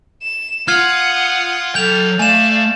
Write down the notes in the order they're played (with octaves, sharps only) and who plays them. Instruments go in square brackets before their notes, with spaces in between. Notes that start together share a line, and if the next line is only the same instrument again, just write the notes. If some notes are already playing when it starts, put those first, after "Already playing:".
[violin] E7
[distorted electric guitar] F4 [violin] F#5 D#6 [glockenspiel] F6 G#6 C7
[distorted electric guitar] F#3 G5 [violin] A4 [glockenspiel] G6 F7
[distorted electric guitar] A3 [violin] D5 F5 [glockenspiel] G#5 E7